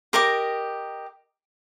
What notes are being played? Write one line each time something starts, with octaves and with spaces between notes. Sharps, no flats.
G4 A#4 D#5 D6